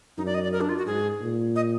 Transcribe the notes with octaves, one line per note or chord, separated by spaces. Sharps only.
F#2 D#4
D5
D#5
D5
A#4
D4
F4
F#4
G#2 G#4
A#2
D#5